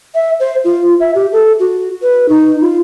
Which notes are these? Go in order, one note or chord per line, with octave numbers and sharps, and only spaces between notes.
E5
C5
F4
E5
G4
A4
F#4
B4
D#4
F4